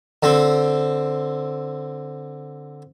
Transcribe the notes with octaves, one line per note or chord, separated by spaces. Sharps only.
D3 C4